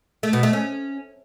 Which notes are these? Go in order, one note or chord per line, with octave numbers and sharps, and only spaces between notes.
A3
B2
A3
C#4